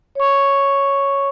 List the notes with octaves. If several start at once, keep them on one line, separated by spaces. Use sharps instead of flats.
C#5 C#6